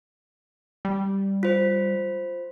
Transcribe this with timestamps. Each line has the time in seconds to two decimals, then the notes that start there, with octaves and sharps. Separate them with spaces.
0.85 G3
1.43 F4 C5